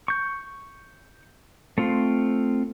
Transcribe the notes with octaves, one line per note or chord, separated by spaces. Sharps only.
C#6 G6
A3 C4 F4